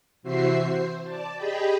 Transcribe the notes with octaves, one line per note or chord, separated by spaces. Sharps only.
C3 E3 F#4 C5 E5 C7
C5
D5 A5
G4 G#4 D#5 G5 B5